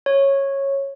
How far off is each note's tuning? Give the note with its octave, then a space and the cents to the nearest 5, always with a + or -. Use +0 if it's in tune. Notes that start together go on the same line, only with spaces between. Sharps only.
C#5 -10